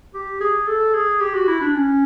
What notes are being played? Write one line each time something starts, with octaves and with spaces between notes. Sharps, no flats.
G4
G#4
A4
G#4
G4
F#4
E4
D4
C#4